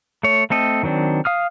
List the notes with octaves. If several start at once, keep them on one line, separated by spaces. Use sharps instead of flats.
A3 C#5
A3 C4 A4 D#5
D#3 F#3 C4 D4
F5 D#6 F6